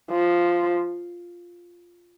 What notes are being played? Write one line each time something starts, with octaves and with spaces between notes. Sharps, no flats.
F3